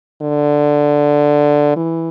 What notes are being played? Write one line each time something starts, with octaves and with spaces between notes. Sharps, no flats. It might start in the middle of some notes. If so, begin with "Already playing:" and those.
D3
E3